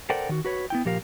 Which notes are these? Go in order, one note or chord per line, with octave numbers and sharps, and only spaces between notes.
A4 A#4 C5 D5 F#5 G5
D#3 F#4
F#4 B4 C#5
B3 E4 G5
A#2 F3 G4 A#4 F5